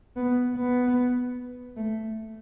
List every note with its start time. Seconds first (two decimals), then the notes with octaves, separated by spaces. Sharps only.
0.16 B3
0.56 B3
1.77 A3